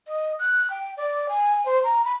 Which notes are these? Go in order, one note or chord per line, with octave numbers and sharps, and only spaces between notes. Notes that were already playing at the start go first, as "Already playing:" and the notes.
D#5
F#6
G5
D5
G#5
C5
A#5
B5